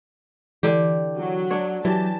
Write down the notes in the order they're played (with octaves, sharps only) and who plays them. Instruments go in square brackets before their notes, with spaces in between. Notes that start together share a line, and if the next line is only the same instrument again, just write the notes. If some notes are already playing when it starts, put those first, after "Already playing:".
[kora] D3 D4 G4 [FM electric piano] E3
[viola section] F#3
[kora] D4 C#5
[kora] E3 [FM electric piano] F#3 [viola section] G4 A5